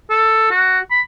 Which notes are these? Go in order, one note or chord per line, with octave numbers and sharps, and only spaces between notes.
A4
F#4
B5